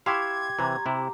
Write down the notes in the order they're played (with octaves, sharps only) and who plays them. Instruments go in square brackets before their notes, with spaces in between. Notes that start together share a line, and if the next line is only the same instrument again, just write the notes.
[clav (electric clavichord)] E4 E5 F5 [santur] G4 C6 C#6 [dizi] G#6
[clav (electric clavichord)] C3 E3 [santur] A#5
[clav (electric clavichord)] C3 E4